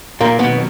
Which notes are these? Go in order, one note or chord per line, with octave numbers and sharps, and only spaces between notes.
F2 A#2 D#3 F#3 A#3
B2 B3